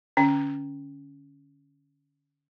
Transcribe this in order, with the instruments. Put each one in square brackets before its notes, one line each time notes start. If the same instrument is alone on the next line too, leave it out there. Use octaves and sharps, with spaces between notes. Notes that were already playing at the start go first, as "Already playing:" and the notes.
[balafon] D3 C#4 G5